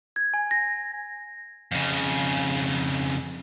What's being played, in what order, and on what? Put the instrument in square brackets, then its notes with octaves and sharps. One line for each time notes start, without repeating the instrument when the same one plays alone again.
[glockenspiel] G#6
G#5
A#6
[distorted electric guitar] F2 C#3